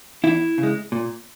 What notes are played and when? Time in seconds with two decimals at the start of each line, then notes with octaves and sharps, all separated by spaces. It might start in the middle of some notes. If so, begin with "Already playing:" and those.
0.24 E2 E4
0.58 C#3
0.63 G#3
0.92 A#2